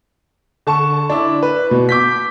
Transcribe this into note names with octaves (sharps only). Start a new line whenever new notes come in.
D3 A5 C#6 E7
D4 E4
B4
B2
D6 G6 B6